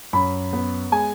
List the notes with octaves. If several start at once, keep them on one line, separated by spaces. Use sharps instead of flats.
F#2 B5
B3
G#3 G#5